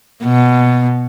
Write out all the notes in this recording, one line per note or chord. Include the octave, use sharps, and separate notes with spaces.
B2